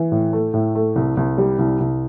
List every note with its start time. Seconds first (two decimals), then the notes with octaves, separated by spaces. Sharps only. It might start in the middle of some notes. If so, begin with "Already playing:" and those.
Already playing: E3
0.12 A2
0.33 A3
0.54 A2
0.75 A3
0.96 C2
1.17 C2
1.38 G3
1.59 C2
1.80 C2